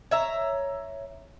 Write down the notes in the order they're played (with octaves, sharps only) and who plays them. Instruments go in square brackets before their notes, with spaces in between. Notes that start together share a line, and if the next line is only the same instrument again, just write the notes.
[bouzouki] C#5 E5 A#5